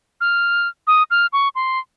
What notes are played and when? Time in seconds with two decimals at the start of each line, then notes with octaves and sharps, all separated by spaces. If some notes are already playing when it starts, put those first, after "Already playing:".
0.21 F6
0.87 D#6
1.11 F6
1.33 C#6
1.55 C6